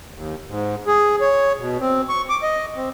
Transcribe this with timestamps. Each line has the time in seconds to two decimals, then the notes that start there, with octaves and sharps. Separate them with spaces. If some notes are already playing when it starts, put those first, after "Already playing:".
0.14 D#2
0.47 G#2
0.87 G#4
1.21 C#5
1.59 B2
1.81 C4
2.09 C#6
2.29 D6
2.43 D#5
2.76 C4